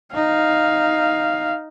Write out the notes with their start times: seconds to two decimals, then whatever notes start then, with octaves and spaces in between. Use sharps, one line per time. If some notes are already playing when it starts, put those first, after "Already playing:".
0.15 D#4 F5